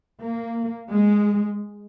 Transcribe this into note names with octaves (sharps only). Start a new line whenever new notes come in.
A#3
G#3